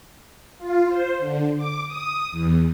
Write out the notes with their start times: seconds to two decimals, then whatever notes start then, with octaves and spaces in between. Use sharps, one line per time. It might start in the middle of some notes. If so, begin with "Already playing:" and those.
0.59 F4
0.89 C5
1.19 D3
1.57 D6
1.87 D#6
2.32 E2